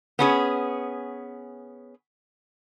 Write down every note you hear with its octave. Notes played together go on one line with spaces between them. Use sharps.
B3 C#4 G#4